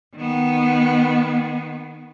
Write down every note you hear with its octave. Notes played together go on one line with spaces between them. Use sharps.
D#3 B3